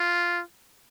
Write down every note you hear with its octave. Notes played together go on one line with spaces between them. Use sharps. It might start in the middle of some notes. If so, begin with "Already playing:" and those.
Already playing: F4